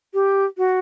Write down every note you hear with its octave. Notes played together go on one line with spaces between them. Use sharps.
G4
F#4